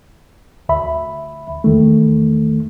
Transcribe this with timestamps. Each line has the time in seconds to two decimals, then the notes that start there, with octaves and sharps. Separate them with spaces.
0.69 D2 E5 B5
1.64 E2 D#3 A3